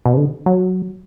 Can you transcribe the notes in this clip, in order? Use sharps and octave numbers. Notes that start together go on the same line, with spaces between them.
B2
C3
D3
F#3